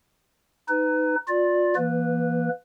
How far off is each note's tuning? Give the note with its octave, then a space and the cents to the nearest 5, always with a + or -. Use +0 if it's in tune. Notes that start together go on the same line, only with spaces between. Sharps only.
D#4 +0 B4 +25
F4 +30 D5 +0
E3 +25 A#3 +30 B4 +0